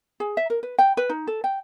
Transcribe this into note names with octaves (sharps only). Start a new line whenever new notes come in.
G#4
E5
A#4
B4
G5
B4
D#4
A4
G5